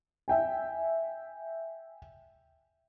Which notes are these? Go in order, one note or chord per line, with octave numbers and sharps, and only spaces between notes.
E5 G5 G#5